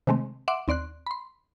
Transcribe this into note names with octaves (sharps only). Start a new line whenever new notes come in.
C3 D#3 G#3 A3 C4
E5 F#5 C6 D6 D7
D#2 C4 D5 C6 F#6
B5 C6